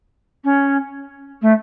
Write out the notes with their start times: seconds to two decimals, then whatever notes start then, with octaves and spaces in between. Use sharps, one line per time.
0.44 C#4
1.42 A3